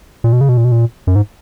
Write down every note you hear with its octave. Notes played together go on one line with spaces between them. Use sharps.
A#2
B2
C#3
B2
A#2
B2
A#2
F#2
G#2